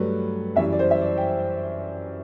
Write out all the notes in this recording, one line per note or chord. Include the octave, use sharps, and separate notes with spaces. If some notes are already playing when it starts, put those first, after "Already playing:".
Already playing: G2 F#3 A3 B4
F#2 E3 G3 E5
D5
C5
E5
D5
G5